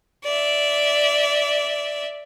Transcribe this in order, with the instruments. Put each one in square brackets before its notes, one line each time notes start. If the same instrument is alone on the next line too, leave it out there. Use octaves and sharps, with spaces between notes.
[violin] D5 E5